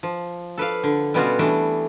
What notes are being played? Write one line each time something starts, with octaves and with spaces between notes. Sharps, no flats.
F3
A4 B4 D5 F5
D3
B2 G3 B3 C#4 F4 F#4
E3 G3 A3 D4